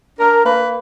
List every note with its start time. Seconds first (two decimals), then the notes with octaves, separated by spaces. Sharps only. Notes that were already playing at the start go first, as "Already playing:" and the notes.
0.19 D4 A#4
0.45 A#3 B4